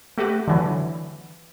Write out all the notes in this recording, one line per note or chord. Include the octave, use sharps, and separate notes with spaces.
A3 F#4 G4 B4
D3 E3 F#3